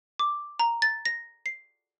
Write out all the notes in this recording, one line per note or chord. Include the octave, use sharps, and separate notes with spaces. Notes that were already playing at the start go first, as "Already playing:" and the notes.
D6
A#5
A6
A#6
C7